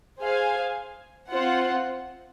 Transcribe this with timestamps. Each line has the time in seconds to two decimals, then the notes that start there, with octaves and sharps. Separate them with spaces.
0.19 G#4 C5 F5 G#5
1.30 C4 F4 C5 F#5